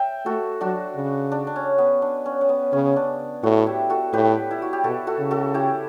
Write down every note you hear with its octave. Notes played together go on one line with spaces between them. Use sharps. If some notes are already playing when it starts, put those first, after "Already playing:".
Already playing: E5 G5
A3 F#4 A4
F#3 D4 F#4
C#3
D4
D4
C#4
B3
D4
C#4
C#4
B3
C#3 C#4
D4
A2 F#4 A4
E4 G4
F#4 A4
A2 G4 B4
E4
F#4
G4
B2 F#4 A4
F#4 A4
C#3
F#4 A4
E4 G4